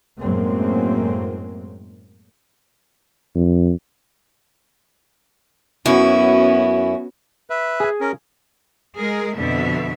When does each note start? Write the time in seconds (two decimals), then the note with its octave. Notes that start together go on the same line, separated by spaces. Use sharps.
0.19 F#2 A2 F#3 G#3 A#3 C4
3.35 F2
5.86 F#2 B3 C#4 E4 F#4
7.50 B4 E5
7.80 G#4 G#5
8.01 C#4 A#4
8.98 G#3 G#4 A#4
9.35 F2 B2 D3 E5